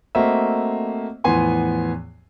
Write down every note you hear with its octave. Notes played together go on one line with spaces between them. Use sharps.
A3 A#3 C4 F#4 D#5 E5
E2 A2 F3 B3 G#5 C6